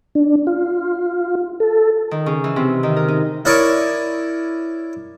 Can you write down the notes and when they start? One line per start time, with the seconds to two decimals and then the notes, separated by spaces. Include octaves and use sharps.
0.15 D4
0.47 F4
1.60 A4
2.11 D#3
2.26 C#3
2.44 E3
2.56 C3
2.83 D#3
2.96 A#4
3.08 D#4
3.45 E4 A#4 C#5 D5 C#6 D#6